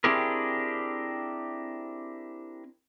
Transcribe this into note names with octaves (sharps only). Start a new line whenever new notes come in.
C4 D4 E4 G4 G#4 A#4